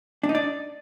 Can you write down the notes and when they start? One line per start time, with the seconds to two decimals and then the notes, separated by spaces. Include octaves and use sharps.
0.23 D4
0.29 D#4
0.35 D5